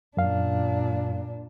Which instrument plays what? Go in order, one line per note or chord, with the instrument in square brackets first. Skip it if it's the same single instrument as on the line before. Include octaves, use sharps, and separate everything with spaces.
[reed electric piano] F#2 F5 [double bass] A#2 D4